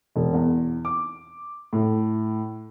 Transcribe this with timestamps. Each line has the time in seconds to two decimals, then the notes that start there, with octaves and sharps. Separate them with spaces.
0.16 E1
0.34 E2
0.85 D6
1.73 A2